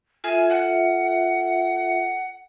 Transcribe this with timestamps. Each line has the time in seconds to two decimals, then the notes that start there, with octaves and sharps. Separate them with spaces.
0.24 F4 A4 E5 G#5
0.50 F#5